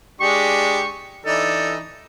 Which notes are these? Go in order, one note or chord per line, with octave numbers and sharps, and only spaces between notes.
G#3 D4 G4 C#6
E3 D4 D#4 A4